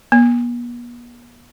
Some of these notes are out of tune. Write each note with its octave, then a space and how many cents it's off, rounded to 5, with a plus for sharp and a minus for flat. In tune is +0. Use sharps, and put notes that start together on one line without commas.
B3 -45